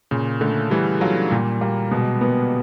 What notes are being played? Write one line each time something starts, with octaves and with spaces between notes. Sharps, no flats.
A#2 C#3
D3 A3
E3 G3
F#3 F4
A#2 G3
G3 A#3
B2 G#3
A#3 B3